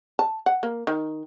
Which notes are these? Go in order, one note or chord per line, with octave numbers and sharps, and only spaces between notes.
A5
F#5
A#3
D#3